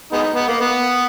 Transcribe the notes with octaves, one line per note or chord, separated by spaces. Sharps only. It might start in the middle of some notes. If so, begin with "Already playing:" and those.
G#3 B3 D#4
B3
A#3
B3